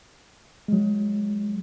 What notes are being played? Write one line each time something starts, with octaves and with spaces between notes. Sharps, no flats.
F#3 G#3